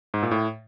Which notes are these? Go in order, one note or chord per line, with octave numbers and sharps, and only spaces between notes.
G#2
A#2
A2